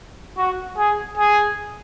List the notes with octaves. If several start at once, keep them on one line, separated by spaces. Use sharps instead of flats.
F#4
G#4
G#4